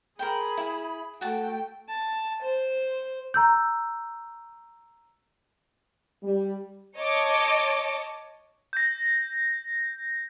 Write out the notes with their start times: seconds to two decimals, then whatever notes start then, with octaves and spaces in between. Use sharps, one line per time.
0.19 G#4 A#4 C5 G5 B5
0.57 E4
1.21 A3 F#4 G5 A5
1.88 A5
2.42 C5
3.34 A#5 E6 G6
6.23 G3
6.97 C#5 D#5 A5 D6
8.73 G6 A#6